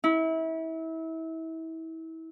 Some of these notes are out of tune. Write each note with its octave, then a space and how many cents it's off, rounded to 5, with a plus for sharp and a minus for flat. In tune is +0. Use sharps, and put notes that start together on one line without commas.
E4 -30